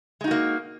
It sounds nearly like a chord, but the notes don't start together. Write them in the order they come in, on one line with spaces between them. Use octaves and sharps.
G#3 D#4 F#4 A#3